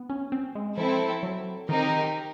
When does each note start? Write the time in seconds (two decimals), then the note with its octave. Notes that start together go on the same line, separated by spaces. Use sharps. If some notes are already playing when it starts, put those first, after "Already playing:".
Already playing: B3
0.10 C#4
0.32 C4
0.55 G#3
0.77 F3 C4 E4 A4
1.23 F#3
1.69 D#3 C4 D#4 G4 A#4